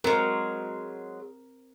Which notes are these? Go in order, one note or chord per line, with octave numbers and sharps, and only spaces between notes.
F#3 G#3 C4 A#4